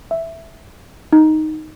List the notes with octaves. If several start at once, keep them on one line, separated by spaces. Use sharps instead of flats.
E5
D#4